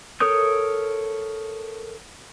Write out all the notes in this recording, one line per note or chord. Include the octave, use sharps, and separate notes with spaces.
A4 A#4 C#5 D#6 G6